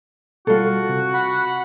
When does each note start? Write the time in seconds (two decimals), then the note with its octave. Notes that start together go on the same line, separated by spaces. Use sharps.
0.47 B2 G3 F4 F#4 A4
0.89 C3
1.14 F#5 B5